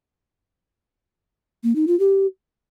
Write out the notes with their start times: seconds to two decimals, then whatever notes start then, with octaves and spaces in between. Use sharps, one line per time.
1.64 A#3
1.76 D#4
1.88 F4
2.00 G4